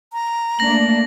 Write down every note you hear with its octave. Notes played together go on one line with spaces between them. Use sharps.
A#5
A3 A#3 D4 A#6 F#7